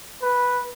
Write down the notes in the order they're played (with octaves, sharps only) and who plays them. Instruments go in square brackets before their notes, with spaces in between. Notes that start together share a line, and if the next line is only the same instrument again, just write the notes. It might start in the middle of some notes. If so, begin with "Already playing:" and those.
[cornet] B4